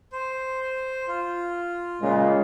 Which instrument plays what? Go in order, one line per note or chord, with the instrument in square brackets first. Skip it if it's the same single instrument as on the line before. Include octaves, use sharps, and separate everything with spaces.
[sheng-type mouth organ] C5
F4
[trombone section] A#2 C#3 [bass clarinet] G#3